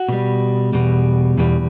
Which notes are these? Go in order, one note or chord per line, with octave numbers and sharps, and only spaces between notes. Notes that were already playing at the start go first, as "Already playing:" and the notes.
Already playing: F#4
B2 G3
E2 B2 G3
E2 B2 G3